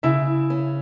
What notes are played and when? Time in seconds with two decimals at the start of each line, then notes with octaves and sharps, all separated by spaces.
0.03 C#3 E4 E5
0.50 C#4